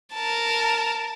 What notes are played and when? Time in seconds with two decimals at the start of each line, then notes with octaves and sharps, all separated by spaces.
0.14 A#4 A5